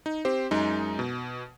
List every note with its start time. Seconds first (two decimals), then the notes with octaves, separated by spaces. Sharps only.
0.06 D#4
0.25 C4 G4 C5
0.51 F#2 G#3 D#4
0.99 B2